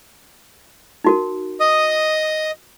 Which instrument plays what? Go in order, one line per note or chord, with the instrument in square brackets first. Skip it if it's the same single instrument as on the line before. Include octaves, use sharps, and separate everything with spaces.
[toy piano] D#4 F#4 A#4
[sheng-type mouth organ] D#5 D#6